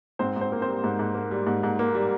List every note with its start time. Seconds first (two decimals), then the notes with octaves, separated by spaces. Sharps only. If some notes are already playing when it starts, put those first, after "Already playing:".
0.19 G#2 C4 C5
0.36 G#2 C4 C5
0.52 A#3
0.62 C4 C5
0.68 G3
0.84 G#2
0.99 G#2
1.15 A#3
1.31 G3
1.47 G#2
1.63 G#2
1.79 A#3
1.95 G3